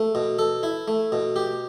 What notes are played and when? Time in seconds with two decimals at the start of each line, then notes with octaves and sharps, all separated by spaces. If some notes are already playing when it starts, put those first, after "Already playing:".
Already playing: A3
0.15 B2
0.39 A4
0.63 E4
0.88 A3
1.12 B2
1.36 G4